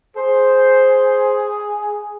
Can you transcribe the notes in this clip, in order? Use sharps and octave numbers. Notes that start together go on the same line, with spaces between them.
G#4 C5